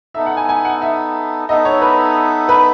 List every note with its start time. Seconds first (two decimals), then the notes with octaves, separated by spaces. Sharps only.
0.15 B3 D#4 A4 E5
0.26 F#5
0.37 G#5
0.49 G#5
0.65 F#5
0.82 E5
1.49 B3 D#4 A4 D#5 E5
1.65 C#5
1.82 B4
2.49 B4